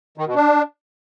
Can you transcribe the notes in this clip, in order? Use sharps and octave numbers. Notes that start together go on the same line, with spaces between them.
D#3
B2
D4